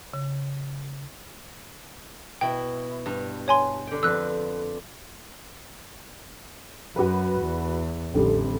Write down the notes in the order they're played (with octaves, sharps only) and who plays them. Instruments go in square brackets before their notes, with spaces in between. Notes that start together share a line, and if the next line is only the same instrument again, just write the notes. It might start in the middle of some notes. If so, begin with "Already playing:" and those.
[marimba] C#3
[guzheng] B2 E4 [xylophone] G5
[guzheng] G2
[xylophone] C#5 G#5 C6
[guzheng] D3 G5
[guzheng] F2 B4 [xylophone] E6 F#6
[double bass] F#2 [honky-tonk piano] F#4 B4
[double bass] E2
[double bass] A1 [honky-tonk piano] F2 D3 G3